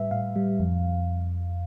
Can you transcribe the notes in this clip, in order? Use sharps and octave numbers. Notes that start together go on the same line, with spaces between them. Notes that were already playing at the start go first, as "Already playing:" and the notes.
Already playing: A2 G3 B4 E5
A2 F5
G3
F2